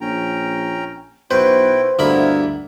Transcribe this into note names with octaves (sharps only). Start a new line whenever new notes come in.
A#1 C#4 G5 A#5
B1 E4 F#4 B4 C5 G5
D2 G2 A#3 B3 E4 A#4 B5